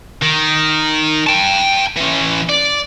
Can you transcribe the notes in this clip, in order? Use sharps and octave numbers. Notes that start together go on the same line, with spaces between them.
D#3
G5 A5
E3 C#4
D5